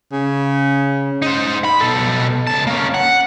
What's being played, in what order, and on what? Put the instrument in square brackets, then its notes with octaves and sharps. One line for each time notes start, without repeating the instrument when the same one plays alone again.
[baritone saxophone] C#3
[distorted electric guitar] D#4 C5
B5
B2 A4
C#2 A5
A#3 C#4
F#5